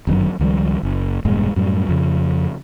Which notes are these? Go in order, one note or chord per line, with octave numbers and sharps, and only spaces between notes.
G1 F#2 D#3 F#3
C#2 D#3 F3 G3
F#1
E1 G2 A#2 G#3
F#2 A2 G3
F2 C#3